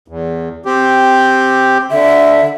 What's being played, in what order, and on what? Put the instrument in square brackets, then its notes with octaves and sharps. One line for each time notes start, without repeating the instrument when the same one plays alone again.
[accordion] E2
C4 G4
[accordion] D3 [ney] E5